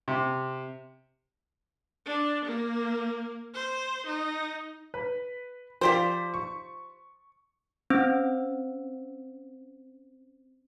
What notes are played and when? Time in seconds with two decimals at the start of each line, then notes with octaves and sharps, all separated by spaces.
0.08 C3
2.06 D4
2.45 A#3
3.54 C5
4.06 D#4
4.94 B4
5.81 F3 F4 G4 C5 D5 B6
6.34 C#6
7.90 C4 C#4 C5 E6